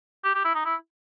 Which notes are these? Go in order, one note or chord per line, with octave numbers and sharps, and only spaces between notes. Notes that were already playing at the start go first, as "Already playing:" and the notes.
G4
G4
E4
D#4
E4